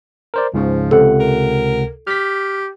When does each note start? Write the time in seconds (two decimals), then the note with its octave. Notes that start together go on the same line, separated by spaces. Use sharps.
0.34 A#4 C5 D5
0.54 C#2 G#2 C#3 F3
0.91 C#2 C3 A4 F#5
1.19 A#4
2.07 G4 F6 B6